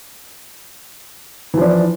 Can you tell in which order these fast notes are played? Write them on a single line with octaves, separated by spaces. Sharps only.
E3 F3 D4